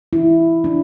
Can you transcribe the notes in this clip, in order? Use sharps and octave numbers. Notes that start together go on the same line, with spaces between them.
E4
D4